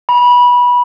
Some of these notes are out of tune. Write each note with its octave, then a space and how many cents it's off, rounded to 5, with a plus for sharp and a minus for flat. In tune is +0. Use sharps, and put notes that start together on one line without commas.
B5 -20